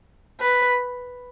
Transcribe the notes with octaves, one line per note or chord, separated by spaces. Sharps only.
B4